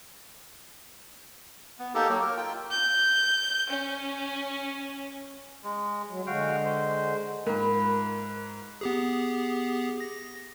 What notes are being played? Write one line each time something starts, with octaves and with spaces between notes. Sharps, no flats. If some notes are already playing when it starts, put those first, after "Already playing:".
B3
A#3 D#4 G4 A4
F#3 A#3
A#4
F4 G5
G6
C#4
G#3
F#3
D3 G#3 F#4 F5 G5
C5
G#2 F4 A#4 B4 B5
B3 G4 G#4
A#6